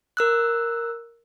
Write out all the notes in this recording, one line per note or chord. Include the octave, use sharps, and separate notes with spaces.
A#4 E6 F#6